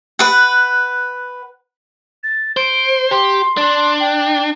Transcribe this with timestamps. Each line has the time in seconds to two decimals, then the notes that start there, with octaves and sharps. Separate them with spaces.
0.19 B4 F#5
2.24 A6
2.57 C5 D7
3.11 G4 C6
3.57 D4
4.00 G5